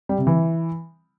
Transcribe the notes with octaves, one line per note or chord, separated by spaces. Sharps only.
G3
C3
E3